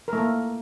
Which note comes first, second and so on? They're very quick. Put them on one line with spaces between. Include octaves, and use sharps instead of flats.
A#4 A3 A#3